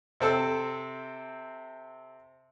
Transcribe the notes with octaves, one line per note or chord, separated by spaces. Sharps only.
C3 C4 A4 E6